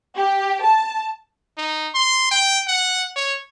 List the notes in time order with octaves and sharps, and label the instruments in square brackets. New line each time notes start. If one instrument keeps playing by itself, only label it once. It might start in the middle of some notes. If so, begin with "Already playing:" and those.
[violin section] G4
A5
[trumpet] D#4
C6
G5
F#5
C#5